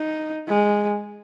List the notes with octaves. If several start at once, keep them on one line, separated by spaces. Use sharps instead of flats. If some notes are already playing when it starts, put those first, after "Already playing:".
Already playing: D#4
G#3